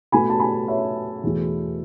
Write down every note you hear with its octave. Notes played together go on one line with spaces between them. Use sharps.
B2 A3 G#5 B5
A5
G#5 B5
C#5 E5
E2 B2 A3